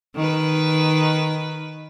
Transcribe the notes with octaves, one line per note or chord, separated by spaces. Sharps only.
D#3 B4